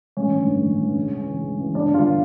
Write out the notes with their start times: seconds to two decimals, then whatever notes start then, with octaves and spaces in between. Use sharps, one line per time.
0.17 A1 C#4 C#5
0.37 G2 D3
0.57 A1
0.76 G2 D3
0.96 C#2
1.15 C#3 E3
1.35 C#2
1.55 C#3 E3
1.74 G1 D4 D5
1.94 G2 D3 F4 F5